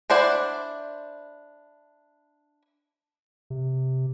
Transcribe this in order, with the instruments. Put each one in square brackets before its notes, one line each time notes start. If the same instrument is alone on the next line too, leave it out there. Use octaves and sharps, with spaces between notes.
[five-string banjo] D4 E4 C5 D5 F#5
[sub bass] C3